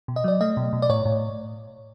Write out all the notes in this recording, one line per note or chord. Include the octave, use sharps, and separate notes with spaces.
B2
D#5
F#3 D5
A3 D#5
B2
B2
D5
A2 C#5
A2